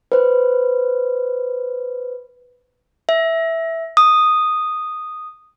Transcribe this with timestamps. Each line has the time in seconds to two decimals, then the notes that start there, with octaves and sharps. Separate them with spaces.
0.12 B4 C5
3.09 E5
3.97 D#6